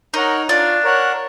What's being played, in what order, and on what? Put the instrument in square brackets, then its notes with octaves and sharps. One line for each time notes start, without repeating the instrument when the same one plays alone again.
[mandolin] D#4 [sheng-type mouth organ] A#4 C#5 F#5
[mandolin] D4 [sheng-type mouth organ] F4
[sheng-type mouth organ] A#4 C#5 F#5